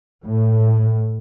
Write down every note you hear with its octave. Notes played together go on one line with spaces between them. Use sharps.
A2